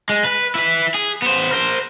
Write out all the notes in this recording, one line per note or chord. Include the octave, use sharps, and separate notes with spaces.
G#3
B4
E4 B4
G#4
B3 C5
A#4 C5